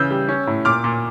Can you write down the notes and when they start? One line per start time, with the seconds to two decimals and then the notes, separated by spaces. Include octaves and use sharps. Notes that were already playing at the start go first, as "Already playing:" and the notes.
Already playing: C#3 E3 E6 G6
0.11 G3
0.29 C#4
0.47 A2
0.65 A#2 D6 F6
0.84 A#2